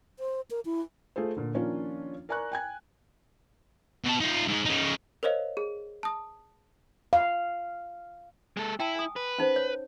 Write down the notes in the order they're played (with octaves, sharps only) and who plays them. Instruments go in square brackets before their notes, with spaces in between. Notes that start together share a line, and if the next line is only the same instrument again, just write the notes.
[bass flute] C5
A#4
E4
[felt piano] A3 F4 G#4 A4 C5
A#2 D3
D#3 F3 A#3 C#4 D4 F4
A#4 D5 G#5 A#5 C#6 F#6
G5 G#5 G#6
[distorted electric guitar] B2 A5
D#4 F4
G#2 G#3
C#3 D#4
[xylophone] A#4 C5 C#5 D#5 F5
G#4
A5 D#6
[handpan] F5
[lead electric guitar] G#3 A4
[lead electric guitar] E4 [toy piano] G5 A5
[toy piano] G#5 D#6
[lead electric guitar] B4
[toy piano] C#4 D#4 C5
C#5